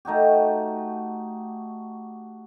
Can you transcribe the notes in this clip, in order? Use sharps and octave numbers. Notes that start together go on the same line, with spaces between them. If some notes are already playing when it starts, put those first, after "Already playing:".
A3 D#4 F#4 G4